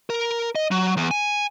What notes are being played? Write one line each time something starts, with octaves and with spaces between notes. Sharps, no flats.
A#4
D#5
F#3
E2
G#5